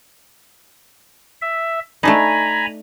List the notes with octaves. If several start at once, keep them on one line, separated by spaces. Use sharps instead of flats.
E5
A3 D4 D#4 G#5 A#5 B5